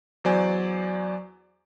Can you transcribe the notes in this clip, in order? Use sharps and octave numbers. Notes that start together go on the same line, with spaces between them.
E2 F#3 C5 D5 G#5